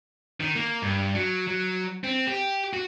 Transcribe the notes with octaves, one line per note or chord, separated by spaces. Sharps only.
D#3
A#3
G2
F#3
F#3
C4
G4
F#4